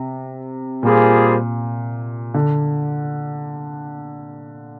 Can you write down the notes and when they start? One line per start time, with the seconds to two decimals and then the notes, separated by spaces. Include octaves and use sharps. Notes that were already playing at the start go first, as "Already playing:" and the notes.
Already playing: C3
0.83 A#2 G3 A#3 F4 G#4 C5
2.34 D3